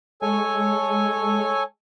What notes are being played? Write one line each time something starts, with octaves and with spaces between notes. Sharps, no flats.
G#3 A4 C#5 G#5